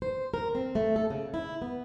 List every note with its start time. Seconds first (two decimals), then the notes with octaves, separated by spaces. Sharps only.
0.02 C5
0.34 A#4
0.55 C4
0.75 A3
0.96 A4
1.10 C#3
1.34 E4
1.62 B3